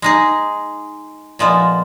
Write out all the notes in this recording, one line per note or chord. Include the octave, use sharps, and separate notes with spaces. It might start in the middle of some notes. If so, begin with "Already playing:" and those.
G#3 D#4 G#4
A#2 F3 G#3 B3